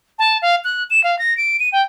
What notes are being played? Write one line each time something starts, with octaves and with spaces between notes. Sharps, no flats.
A5
F5
F#6
E7
F5
A#6
D7
D#7
G5